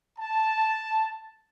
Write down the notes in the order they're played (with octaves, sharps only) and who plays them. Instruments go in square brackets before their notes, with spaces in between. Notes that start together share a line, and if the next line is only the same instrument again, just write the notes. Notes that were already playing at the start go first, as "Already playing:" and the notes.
[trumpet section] A5